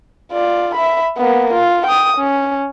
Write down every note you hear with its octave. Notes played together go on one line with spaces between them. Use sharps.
F4 D5
E5 B5
A#3 B3
F4
G5 D#6
C#4